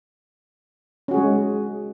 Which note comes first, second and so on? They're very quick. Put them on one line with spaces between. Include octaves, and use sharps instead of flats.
C#4 F#4 G#4 G#3